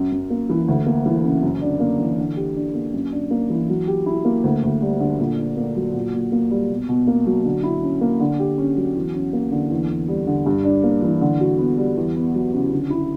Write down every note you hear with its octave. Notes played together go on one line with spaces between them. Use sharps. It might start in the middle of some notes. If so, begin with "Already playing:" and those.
Already playing: F#2
F#2
A#3
E3
D2
A#3
E3
C#3
F#2
D4
A#3
E3
D3
G4
D4
A#3
F#2
D4
A#3
E3
F#3
G4
E4
A#3
D2
D2
G3
D3
A#2
D4
A#3
F#3
A#2
A#2
A#3
G3
B2
B2
A#3
F#3
D3
E4
C#4
A#3
D3
G4
C#4
F#3
E2
C#4
A#3
D3
E2
E2
G3
D3
G2
D4
A#3
E3
D3
F#4
B3
G3
E2
B3
F#3
C#3
D3
E4